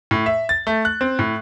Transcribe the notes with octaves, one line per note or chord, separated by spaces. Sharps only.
A2
E5
A6
A3
F#6
C4
A2